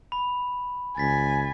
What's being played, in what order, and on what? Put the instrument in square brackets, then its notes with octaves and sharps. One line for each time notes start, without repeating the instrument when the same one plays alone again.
[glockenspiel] B5
[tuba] C#2 [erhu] G#5 [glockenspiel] A6 B6